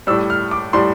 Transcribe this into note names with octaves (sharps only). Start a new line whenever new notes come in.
A2 G3 E6
F6
D6
A2 G3 C6